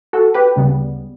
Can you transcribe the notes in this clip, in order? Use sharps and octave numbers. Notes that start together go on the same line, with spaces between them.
F#4 A4
G4 B4
D2 C#3 G3 B3